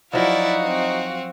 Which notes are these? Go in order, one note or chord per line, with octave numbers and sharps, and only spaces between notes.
F3 F#3 D#4 E4 F#4 D5 F5
C4